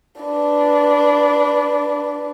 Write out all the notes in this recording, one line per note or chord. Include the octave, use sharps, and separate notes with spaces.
D4 B4